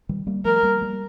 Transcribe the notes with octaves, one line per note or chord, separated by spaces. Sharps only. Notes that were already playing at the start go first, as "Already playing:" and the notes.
D#3 G3
G3 A#3
F3 A3 A#4
G3 A#3
G3 A#3